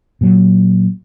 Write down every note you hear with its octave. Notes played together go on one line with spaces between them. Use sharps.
A#2 F#3